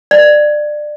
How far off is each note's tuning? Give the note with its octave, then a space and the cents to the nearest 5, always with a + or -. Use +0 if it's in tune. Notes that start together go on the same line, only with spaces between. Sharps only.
D5 +25